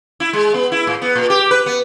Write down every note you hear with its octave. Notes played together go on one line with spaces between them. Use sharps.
E4
G#3
B3
E4
A2
B3
A#2
G4
B4
B3